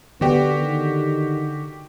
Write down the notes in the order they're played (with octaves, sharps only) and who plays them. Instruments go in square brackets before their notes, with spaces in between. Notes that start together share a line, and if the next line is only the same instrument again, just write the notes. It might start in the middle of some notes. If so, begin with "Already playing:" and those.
[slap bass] D3 [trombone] B3 [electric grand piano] F#4 G4 G5
[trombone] D#3